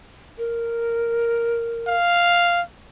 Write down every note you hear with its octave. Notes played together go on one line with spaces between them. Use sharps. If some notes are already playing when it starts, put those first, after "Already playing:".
A#4
F5